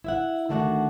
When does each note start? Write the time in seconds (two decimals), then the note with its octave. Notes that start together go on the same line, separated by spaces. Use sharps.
0.04 E4 E5 F#5
0.49 D2 D#3 A3 D4 F#4 F#5